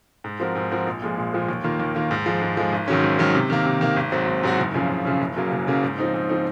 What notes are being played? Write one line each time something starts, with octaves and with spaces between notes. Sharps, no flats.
G#2
F3 C4 F#4 A#4
G#2
F3 C4 F#4 A#4
A#1
A#2 F3 G#3
A#1
A#2 F3 G#3
D#2
D#3 A#3 F4
D#2
D#3 A#3 F4
G#2
F3 G#3
G#2
F3 G#3
G#1
G#2 D#3 F#3 C#4
G#1
G#2 D#3 F#3 C#4
C3
D#3 A#3
C3
D#3 A#3
G#1
G#2 F#3 C4 F#4
G#1
G#2 F#3 C4 F#4
F#1
F#2 C#3 F3
F#1
F#2 C#3 F3
F#1
F#2 C#3 F#3 A#3
F#1
F#2 C#3 F#3 A#3
G#2
F3 C4 D#4
G#2
F3 C4 D#4